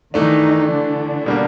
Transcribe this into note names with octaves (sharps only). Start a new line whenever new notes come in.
D#3 E3 A3 D4 D#4
D3 D4
B2 G3 A#3